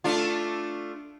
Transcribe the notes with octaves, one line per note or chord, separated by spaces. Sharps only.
A3 D4 F4